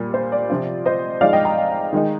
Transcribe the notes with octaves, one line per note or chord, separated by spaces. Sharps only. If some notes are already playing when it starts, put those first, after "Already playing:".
Already playing: A#2 G3 A#3
C5
D5
C3 F3 C4 F4
C5 D#5
F3 G#3 D#4 D5 F5
D#5 G5
G5 A#5
D#3 G#3 D#4